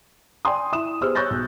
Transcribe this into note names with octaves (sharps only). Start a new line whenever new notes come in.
D5 G5 G#5 C6 D#6
E4 D#6 E7
B3 G4 G#4 C5 E6 F6
C#5 C#6 F#6 G6 A6 A#6
B1